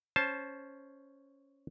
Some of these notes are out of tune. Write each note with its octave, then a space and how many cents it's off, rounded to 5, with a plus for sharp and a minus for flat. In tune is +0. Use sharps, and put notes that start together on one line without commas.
C#4 +0 C5 +5 A5 -15